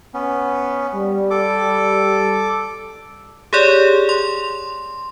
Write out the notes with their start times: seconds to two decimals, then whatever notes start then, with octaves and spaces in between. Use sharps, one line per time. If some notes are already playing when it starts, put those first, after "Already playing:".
0.14 B3 C#4
0.95 G3
1.31 A4 D6
3.53 G4 G#4 C#5 D5
4.09 C6